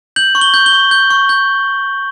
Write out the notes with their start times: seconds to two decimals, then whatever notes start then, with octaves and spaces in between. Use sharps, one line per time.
0.16 G6 F#7
0.35 C#6
0.41 G7
0.54 G6
0.66 G7
0.73 C#6
0.91 G6
1.10 C#6
1.29 G6